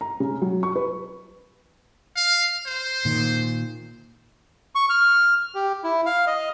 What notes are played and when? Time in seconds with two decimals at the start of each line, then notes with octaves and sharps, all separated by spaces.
0.01 A#5
0.20 C#3
0.42 F#3
0.63 C#6
0.76 B4
2.16 F5
2.66 C5
3.05 A#2 D#3
4.75 C#6
4.89 F6
5.55 G4
5.84 E4
6.06 F5
6.27 D#5